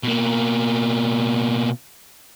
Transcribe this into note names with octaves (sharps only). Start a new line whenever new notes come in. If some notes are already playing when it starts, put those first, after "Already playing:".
B2 A#3